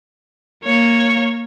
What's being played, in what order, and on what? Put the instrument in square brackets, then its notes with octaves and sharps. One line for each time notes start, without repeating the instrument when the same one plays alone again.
[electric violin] A#3 C#5